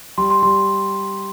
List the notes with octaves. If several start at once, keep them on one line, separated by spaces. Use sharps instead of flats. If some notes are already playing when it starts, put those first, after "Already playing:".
G3 C6
C6
G3 C6